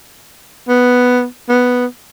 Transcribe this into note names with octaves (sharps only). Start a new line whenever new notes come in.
B3
B3